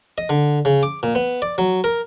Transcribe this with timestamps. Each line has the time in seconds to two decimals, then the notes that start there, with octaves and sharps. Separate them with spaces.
0.18 D#5
0.29 D3
0.65 C#3
0.83 D6
1.03 A#2
1.15 B3
1.42 D5
1.58 F#3
1.84 A#4